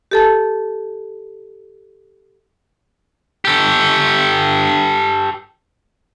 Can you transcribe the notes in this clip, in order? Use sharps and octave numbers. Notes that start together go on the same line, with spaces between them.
G4 A4 A5
G4 A4